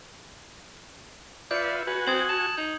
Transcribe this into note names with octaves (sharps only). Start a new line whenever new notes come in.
F4 B4 D5 E5 G6 C#7
F#4 B4 G#5
C4 D#6 G#6 F#7
A5
D#4 G6